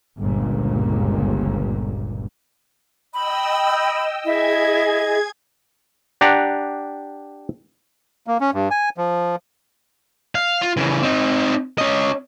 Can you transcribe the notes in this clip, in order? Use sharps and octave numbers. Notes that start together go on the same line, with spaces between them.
G1 C#2 A#2
D#5 G5 B5 E6
E4 G#4 D#5 G#6
D4 G4 F#5 A#5
A#3
C#4
G2
G#5
F3
F5
F4
C#3 E3
C4 D#4
C#4 D#5